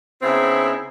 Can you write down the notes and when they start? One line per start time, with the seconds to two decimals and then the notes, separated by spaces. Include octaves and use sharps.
0.21 C#3 B3 C4 D#4 E4